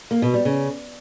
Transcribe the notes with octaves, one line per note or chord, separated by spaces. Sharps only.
A#3
B2
G3
C#3